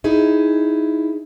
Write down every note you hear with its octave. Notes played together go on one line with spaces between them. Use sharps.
D#4 E4 G#4